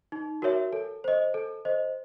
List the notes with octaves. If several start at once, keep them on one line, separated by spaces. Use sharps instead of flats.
D#4
F#4 A#4 C#5 E5
A4
C5 D#5
A4
C5 D#5